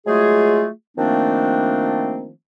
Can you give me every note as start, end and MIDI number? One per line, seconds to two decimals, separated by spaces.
0.07 0.68 54
0.07 0.68 56
0.07 0.68 57
0.07 0.68 65
0.07 0.68 68
0.97 2.30 51
0.97 2.30 53
0.97 2.30 57
0.97 2.30 58
0.97 2.30 60
0.97 2.30 62